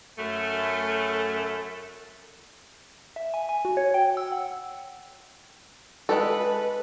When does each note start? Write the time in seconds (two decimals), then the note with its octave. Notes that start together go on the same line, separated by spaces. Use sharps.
0.18 F#2 A3
3.16 E5
3.34 G#5
3.49 G#5
3.65 F#4
3.77 C#5
3.94 G5
4.17 E6
4.32 F#5
6.09 G#3 A4 B4